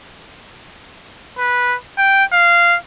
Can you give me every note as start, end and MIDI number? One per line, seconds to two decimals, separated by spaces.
1.38 1.75 71
1.98 2.24 79
2.33 2.76 77